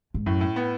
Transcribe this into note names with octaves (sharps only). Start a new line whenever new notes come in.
G#2
F#2 A2
A2
B3